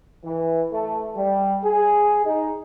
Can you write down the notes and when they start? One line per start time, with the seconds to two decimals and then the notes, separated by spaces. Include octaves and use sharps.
0.25 E3
0.72 A3
1.16 G3
1.64 G#4
2.25 D#4